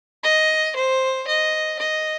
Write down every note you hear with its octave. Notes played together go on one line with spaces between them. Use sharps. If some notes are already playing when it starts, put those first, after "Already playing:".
D#5
C5
D#5
D#5